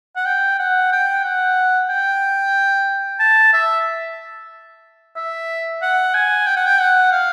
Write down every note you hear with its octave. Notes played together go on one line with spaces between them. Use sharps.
F#5
G5
F#5
G5
F#5
G5
A5
E5
E5
F#5
G#5
G5
F#5
G5
F#5
F5